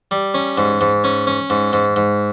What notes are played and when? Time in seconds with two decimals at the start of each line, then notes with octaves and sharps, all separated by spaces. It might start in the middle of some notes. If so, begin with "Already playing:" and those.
0.11 G3
0.34 C#4
0.58 G#2
0.81 G#2
1.04 C#4
1.27 C#4
1.50 G#2
1.73 G#2
1.96 G#2